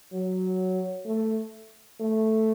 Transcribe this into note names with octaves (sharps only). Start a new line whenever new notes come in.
F#3
A3
A3